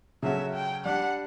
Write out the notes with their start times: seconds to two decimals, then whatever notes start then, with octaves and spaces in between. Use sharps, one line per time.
0.23 C#3 F#3 C#4 F#4 A4 E5
0.54 G5
0.85 G3 D4 G4 F#5